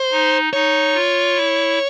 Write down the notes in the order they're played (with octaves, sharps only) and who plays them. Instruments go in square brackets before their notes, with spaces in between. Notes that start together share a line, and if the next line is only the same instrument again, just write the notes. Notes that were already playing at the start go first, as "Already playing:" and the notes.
Already playing: [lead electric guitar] C5
[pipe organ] D#4
[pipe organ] D#4 [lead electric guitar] C#5
[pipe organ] F4
E4